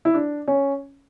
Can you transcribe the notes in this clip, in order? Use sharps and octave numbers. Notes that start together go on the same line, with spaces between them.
E4
D4
C#4